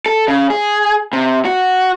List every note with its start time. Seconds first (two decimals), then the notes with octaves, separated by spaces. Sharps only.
0.06 A4
0.28 C#3
0.50 G#4
1.13 C3
1.45 F#4